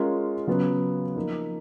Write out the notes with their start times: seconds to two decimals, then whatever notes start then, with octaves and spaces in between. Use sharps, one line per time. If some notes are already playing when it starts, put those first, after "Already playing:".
Already playing: G#3 C#4 F4 A#4
0.47 C#3 F#3 B3
1.16 F3 A#3 D#4